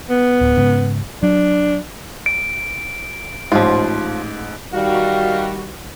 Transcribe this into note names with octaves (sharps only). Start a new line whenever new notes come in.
B3
D1
G#2 C#3
F#3 D4
D7
A1 G#2 F3 F4
D#3 G3 F#4 F5